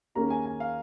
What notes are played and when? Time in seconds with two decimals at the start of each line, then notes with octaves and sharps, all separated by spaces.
0.15 D#2 D#3 A#3 C#4 G#4 A#5
0.30 G#5
0.46 G#5
0.60 F5